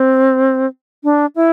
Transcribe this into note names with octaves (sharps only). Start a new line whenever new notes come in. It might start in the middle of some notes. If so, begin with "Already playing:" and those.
Already playing: C4
D4
E4